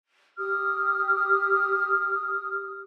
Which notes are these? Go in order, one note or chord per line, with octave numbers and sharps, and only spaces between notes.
G4 D#6 F6